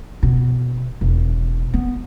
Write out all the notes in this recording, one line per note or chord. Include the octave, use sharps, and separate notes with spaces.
B2
E1
B3